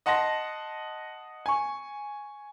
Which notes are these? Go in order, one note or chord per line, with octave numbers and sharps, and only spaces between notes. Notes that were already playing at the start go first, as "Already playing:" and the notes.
D#5 F#5 A5 C6 A#6
G#5 C#6